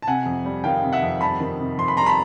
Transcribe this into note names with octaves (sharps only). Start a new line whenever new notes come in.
A5
C3 F#5 G#5
F2
G3
D#3 F5 G5
C3
E5 F#5
F2
G3 A5 B5
D#3
C3
F2 C6
B5
G3 A#5 C6
A5 B5